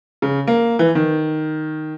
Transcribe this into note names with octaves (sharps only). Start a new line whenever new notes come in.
C#3
A#3
E3
D#3